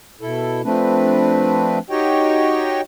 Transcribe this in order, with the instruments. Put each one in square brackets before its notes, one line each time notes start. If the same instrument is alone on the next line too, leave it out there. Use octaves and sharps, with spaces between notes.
[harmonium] B2 E4 A4
F3 A3 C4 D4 B4
D#4 F#4 G4 C#5 D#5 G5